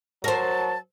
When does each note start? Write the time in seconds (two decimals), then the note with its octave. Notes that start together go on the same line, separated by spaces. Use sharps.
0.24 F#3 A#4 C5 A5